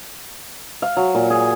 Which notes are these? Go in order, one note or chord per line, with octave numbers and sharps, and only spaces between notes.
F5
F#3
A#2
G#4